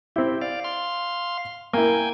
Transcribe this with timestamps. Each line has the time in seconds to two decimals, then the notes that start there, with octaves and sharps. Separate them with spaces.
0.16 C4 E4 G4
0.41 D5 F5
0.64 F5 C6
1.73 A#3 E4 G5 G#5